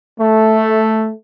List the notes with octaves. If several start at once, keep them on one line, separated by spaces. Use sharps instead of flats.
A3